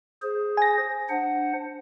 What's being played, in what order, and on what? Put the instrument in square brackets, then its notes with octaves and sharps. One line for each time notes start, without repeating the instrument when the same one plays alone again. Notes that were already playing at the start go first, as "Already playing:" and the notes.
[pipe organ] G#4 C5
[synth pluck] G#5 A#6
[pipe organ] D4 C5 F#5